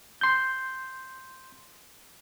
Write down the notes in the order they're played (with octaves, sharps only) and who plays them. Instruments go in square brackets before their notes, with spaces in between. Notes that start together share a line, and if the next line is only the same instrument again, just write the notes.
[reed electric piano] C6 G6